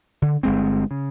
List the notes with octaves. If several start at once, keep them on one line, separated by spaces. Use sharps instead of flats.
D3
G1 G#3 C4
C#3